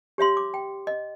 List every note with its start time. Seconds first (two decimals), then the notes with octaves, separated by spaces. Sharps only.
0.18 G4 C#5 E5 C6
0.37 D6
0.54 G5
0.87 D#5